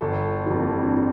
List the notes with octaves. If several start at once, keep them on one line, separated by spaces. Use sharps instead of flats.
G1 A4
F2 E3 G4
A#3
C4
D4
E4